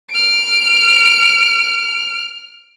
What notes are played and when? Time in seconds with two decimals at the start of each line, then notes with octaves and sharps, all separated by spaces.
0.10 F6 D7